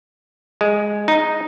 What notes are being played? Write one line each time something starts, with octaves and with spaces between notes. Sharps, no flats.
G#3
D#4